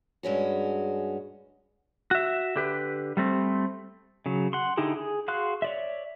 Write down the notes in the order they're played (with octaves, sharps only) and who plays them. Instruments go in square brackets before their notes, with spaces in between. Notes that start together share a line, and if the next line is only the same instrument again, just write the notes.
[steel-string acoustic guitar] G2 G#3 C#4 F#4
[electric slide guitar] F#4 E5
D3 G4 B4
G3 A3 C4
[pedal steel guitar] C#3 F#3
F#5 C6
D3 D#4 E4 G4 G#4
G#4
F#4 G#4 F5 C6 F#6
C#5 D5 E5